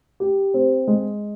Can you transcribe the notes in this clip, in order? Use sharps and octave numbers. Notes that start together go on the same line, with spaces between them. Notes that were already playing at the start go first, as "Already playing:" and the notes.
G4
C4
G#3